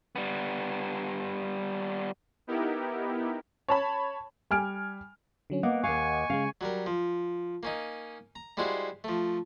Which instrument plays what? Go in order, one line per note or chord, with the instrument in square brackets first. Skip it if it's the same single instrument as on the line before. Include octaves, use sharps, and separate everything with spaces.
[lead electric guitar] G3 B3
[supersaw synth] B3 D#4 E4 G4 A#4
[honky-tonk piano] C#5 A5 B5
[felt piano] G3 G#5 F6 D7
[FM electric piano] D3 F#3 C#4
[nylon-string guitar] A#3 B3 [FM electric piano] D#5 F#5 D6
[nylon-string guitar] D#2 F5 [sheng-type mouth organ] G#5 C#6
[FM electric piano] C#3 G#3 [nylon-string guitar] F5
[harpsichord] F#3 G3 A#4
F3
A#3 C#4 D#4
A#5
G3 G#3 E4 F#4 C5 F5
F3 A3